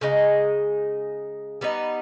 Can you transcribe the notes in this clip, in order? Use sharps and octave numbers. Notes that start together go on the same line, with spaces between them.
C#3 G#3 D#4
G3 B3 D#4